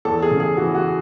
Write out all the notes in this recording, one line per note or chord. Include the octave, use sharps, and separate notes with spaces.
E2 A4
G#4
C#3
G#4
E3 F#4
F#4